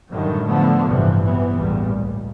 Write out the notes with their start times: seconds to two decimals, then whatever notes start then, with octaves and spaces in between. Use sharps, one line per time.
0.12 F#2 A2 D3 D#3 F#3 G3
0.46 D3 F3 A3 B3
0.87 A1 G2 C3 E3 F3
1.22 C3 E3 F#3 B3
1.57 A1 E2 A#2 G3
1.96 C#2